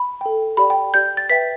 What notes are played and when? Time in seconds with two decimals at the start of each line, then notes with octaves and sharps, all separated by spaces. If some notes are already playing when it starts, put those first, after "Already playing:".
Already playing: B5
0.21 A4 G5
0.57 G4 D5 G5 B5
0.70 G5
0.94 G4 D5 G5 G6
1.17 A6
1.29 B4 E5 G5 B6